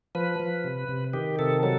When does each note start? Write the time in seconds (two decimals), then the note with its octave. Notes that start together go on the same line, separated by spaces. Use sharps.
0.15 F3 B4
0.40 F3
0.64 C3
0.88 C3
1.13 D#3 G4
1.39 C3 A4
1.63 F#3 A4